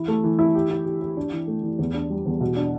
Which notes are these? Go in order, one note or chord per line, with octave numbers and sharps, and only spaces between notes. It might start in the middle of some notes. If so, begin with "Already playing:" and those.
Already playing: E3 E4
A3
E3
E4
G4
E4
G4
G4
D4
E3
A3
E3
E2
D4
G3
E2
B2
D4